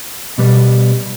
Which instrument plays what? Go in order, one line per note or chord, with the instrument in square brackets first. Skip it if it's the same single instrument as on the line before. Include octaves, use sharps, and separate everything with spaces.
[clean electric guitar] B2 G3 B3